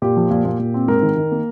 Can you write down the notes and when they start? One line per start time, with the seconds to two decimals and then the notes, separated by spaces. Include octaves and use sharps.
0.02 A#2 G4
0.17 F3
0.31 A#2
0.45 A#2
0.59 A#2
0.74 C4
0.88 G#2 A#4
1.03 D#3
1.17 D#3
1.31 A#3